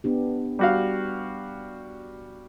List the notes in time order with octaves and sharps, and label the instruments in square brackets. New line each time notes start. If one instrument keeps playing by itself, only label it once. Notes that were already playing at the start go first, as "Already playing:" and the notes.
[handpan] B3 D4 G4
[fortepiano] G3 F#4 F5